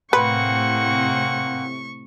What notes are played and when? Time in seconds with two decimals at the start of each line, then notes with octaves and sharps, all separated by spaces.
0.13 A2 C3 A#3 C4 B4 F#5 C#6